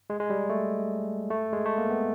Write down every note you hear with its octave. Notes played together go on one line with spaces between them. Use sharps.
G#3
G#3
G3
A3
A3
G#3
A3
A#3
B3